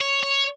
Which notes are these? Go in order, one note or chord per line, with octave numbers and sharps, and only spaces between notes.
C#5
C#5